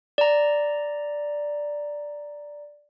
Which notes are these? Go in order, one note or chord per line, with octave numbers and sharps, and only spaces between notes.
D5 A#5